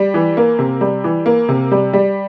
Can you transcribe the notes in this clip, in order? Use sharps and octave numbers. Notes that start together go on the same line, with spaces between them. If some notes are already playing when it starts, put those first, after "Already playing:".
Already playing: G3
E3
A#3
C3
G3
E3
A#3
C3
G3
G3